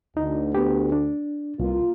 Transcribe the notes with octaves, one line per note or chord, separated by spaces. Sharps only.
D2 D#4
B3 G4
D4
C2 A#3 F4